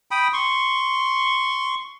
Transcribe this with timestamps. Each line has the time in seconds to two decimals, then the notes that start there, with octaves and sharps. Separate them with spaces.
0.11 G5 B5 D#6
0.33 C6 C#6